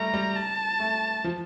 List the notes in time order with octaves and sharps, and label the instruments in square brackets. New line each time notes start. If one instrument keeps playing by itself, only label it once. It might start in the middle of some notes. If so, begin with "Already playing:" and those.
Already playing: [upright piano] G3 A3 [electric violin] A#5
[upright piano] G3
[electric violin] A5
[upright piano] A3
F3